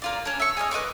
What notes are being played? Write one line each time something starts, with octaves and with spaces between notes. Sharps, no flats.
A#3 F4 D5
C#4 D4
E5 C#6
G#4 C#5 D#5 F6
B4 D#5 C#6 D6